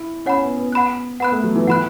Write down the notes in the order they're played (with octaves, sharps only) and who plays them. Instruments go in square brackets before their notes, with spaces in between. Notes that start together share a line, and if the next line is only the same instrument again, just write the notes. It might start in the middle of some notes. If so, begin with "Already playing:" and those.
Already playing: [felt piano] E4
[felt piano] C#4 [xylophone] C#5 F#5 B5
[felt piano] B3
B3
[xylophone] F#5 B5 F#6
[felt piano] B3 [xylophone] F#5 B5 F#6
[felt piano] A3
F#3
E3
[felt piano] E3 [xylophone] F#5 B5 F#6